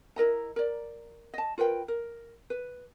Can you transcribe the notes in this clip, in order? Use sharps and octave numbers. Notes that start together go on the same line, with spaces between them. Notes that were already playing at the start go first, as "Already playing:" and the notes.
E4 A#4 D#5 A#5
A#4 D5
D#5 A5
F4 A#4 B4 G5
A#4
B4